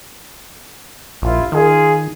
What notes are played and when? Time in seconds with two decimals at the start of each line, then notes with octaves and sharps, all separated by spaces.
1.22 A#1 E4 F4
1.52 D#3 F4 G#4